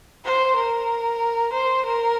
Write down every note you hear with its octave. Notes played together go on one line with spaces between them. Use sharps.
C5
A#4
C5
A#4